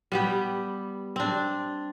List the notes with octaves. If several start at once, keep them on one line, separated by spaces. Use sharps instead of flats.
G3 B3 G4
C4 D4